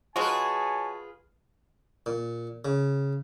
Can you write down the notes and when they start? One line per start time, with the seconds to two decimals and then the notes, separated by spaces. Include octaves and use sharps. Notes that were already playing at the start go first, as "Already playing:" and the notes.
0.16 G#3 F4 F#4 G#4 B4 C#5 G#5 A5
2.06 A#2
2.65 C#3